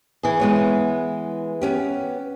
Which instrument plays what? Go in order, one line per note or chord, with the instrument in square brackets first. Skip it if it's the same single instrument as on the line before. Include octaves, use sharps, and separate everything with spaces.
[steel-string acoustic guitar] E3 G#4
[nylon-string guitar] G#3 B3 C#5
B3 C#4 G4